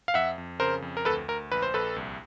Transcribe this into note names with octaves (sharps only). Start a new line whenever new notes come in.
F5
F2 E5 F#5
F2
C#3 A#4 C5
F2
A#4
D2 A4 B4
D2 A#4
A#1 B4
C5
A#1 A4 B4
C2